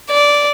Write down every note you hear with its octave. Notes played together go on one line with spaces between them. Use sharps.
D5